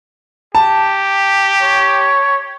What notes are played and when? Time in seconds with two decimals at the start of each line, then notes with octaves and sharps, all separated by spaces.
0.55 G4 A5
1.62 C#5